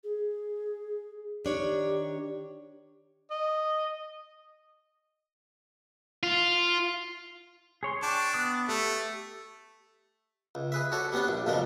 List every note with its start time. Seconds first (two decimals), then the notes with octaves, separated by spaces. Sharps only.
0.04 G#4
1.45 D#3 D4 G4 C#5
3.31 D#5
6.23 F4
7.83 G#4 C#5 C6
8.03 D4 G5 C#6
8.34 B3 D#6 F#6
8.69 A3 G4
10.55 C#2
10.72 G#4 B4 E5
10.92 F#4 A4 C#5 D5
11.12 G3 B3 C#4 D4
11.28 A#1
11.46 B1 F2 A#2 C#3 F3 G#3